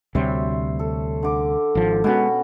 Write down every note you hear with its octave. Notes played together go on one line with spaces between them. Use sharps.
D2 C3 G3 C5 C#5 E5
A4
D3 D6
G#1 F3
B2 G#3 A#3 B3 C#4 F#4